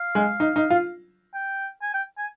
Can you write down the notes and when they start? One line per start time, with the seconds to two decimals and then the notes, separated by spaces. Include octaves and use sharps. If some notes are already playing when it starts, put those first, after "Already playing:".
Already playing: F5
0.15 G#3
0.40 D#4
0.56 D#4
0.70 F4
1.34 G5
1.82 G#5
1.94 G5
2.18 G#5